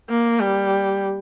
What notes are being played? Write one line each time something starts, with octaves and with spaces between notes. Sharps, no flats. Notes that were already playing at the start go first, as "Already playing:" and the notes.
A#3
G3